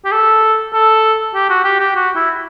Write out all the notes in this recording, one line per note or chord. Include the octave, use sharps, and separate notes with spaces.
G4
A4
A4
G4
F#4
G4
G4
F#4
E4